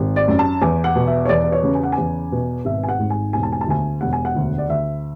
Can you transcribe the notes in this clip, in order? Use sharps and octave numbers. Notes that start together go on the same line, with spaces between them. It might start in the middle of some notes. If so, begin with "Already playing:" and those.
Already playing: G#1
D5
F#2
A5
E2 G#5
F#5
B2
E5
C#5
E2 D5
D5
C#5
C#3
G#5
F#5
G#5
E2
B2
G#1 E5
G#5
F#5
G#2
G#5
E1 G#5
A5
G#5
A5
D2 G#5
E1 F#5
G#5
F#5
D2
D5
D2 E5